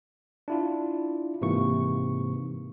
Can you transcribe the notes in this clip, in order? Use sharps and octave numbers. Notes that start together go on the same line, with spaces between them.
D4 E4 F4
G#2 C3 E3 A#3 C#6